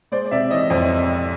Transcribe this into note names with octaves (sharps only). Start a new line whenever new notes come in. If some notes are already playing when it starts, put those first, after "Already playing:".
G#3 C5 D5
C3 D5 E5
E3 C#5 D#5
F2 C5 D5